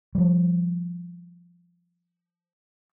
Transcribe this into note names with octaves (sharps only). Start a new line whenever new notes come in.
F3 G3